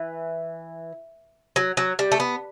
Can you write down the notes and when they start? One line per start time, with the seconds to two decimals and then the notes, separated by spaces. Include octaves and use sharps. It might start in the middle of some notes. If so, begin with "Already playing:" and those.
Already playing: E3
1.56 F#3
1.77 F#3
1.99 G3
2.12 A3
2.20 B3